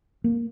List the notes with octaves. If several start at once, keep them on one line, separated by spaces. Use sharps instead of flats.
A#3